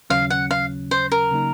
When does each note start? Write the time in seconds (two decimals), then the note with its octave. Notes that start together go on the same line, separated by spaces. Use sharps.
0.10 D#2 C#3 F#3 C#4 F5
0.30 F#5
0.51 F5
0.91 C5
1.12 A#4
1.32 C#3 F#3 A#3 D#4